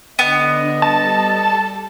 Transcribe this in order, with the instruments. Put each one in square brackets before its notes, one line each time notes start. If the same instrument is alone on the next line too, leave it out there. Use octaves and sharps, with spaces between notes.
[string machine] D3 D4 [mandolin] B3 [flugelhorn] D#5
[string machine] G3 A4 [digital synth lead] A5